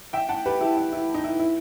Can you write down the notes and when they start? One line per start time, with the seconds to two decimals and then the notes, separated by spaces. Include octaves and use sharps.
0.13 E5 G5
0.29 F#5 A5
0.46 G4 B4
0.61 E4 G4
0.77 E4
0.92 E4
1.14 D#4
1.24 E4
1.39 E4